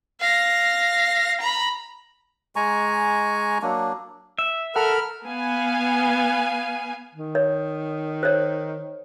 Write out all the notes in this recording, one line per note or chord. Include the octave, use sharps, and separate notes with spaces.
F5 A#6
A#5 B5
G#3 G#5 A#5 C#6
F#3 A#3 D4
E5
A4 A#4 F#5 B5 F6
B3 F5 G#5
D#3
C#5
C5 C#5